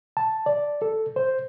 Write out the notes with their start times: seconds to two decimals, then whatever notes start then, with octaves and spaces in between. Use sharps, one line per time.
0.17 A5
0.46 D5
0.82 A4
1.16 C5